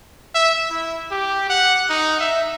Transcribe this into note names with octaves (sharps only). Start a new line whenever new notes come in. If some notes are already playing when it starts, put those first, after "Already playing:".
E5
E4
G4
F#5
D#4
E5